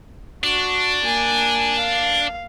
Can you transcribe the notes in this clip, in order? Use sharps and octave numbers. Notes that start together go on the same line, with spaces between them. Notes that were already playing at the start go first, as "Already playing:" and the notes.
D4 F#4
A#3 G#5
F5